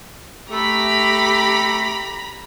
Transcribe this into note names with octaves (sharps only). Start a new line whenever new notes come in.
A3 G4 A#5 B5